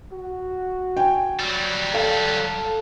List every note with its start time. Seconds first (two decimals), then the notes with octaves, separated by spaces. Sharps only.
0.12 F#4
0.97 G5 G#5
1.40 F#3 G3
1.94 A4 F5